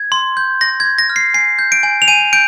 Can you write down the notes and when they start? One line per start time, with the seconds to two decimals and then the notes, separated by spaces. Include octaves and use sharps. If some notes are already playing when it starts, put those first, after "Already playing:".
Already playing: G#6
0.12 C6
0.37 G6
0.61 C6 A#6
0.80 G#6
0.86 C6
0.98 A#6
1.10 F6
1.16 C7
1.34 G#5 C7
1.59 G6
1.72 D7
1.83 G#5
2.02 F7
2.08 G#5 D#7
2.33 G6 D7